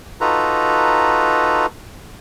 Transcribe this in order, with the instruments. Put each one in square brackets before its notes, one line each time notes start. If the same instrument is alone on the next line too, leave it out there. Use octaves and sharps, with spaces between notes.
[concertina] D#4 F4 F#4 A4 B4 A#5